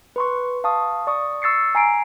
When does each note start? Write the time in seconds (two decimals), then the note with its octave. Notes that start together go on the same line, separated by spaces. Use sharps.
0.16 B4 C6 C#6
0.64 F5 A5 C#6 D#6
1.07 D5 C#6 D#6
1.42 C#6 E6 A6 C7 C#7
1.75 G#5 A#5 C7 D7